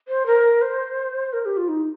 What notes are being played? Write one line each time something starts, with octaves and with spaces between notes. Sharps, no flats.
C5
A#4
C5
A#4
G4
F4
D#4